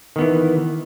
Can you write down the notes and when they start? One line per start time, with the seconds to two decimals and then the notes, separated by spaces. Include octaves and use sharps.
0.16 D#3
0.19 B3
0.21 E3